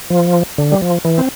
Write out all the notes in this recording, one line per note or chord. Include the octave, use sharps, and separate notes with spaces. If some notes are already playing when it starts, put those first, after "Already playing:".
F3
D3
G3
F3
E3
C4